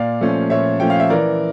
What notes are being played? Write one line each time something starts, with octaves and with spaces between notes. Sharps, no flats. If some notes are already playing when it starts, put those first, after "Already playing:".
Already playing: A#2 D5 F5
F3 A3 C#4
A#2 C#5 E5
F3 A3 C#4 G5
F5
E5
E3 A#4 D5